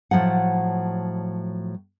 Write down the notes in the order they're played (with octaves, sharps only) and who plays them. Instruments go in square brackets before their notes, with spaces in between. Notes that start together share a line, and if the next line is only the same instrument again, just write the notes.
[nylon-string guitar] A2 F3 F#3 F#5